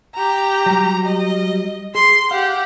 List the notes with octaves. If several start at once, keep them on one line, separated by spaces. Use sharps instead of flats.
G4 A#5
F#3 G3
D#5
G#4 C6
G4 F5 F#5